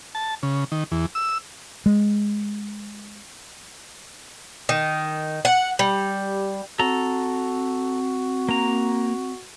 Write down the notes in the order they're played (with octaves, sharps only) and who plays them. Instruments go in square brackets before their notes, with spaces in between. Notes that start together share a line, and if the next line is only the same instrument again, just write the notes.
[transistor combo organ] A5
C#3
D#3
E2
E6
[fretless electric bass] G#3
[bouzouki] D#3
F#5
G3
[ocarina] C4 [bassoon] F#4 [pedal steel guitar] A4 A#5
[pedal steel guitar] A#3 A#5